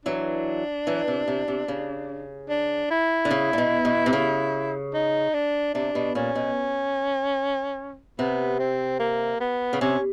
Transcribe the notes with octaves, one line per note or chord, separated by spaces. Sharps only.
E3 F#3 D4
E3 F#3
C3
C3
C3
C#3
D4
E4
D3
C#3
A#2
B2
B2
C3
C#3
D#4
D4
C3 D4
B2
A#2 C#4
B2
C3 B3
C4
A#3
B3
C#3
C3 C#4